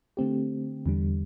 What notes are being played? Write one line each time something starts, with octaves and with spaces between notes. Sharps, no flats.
D3 A3 C4 G4
E2 D3 G3